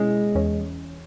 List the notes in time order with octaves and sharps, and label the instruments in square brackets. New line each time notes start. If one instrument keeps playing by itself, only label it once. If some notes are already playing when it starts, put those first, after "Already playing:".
Already playing: [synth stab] B2 C#4 E4 [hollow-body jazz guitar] G#3
[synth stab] E2 E3 C#4